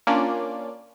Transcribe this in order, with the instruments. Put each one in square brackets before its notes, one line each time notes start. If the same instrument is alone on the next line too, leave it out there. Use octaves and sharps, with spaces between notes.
[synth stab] A#3 C#4 D4 F4 D5